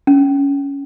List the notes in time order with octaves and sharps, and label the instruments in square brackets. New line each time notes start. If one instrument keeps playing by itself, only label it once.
[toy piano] C#4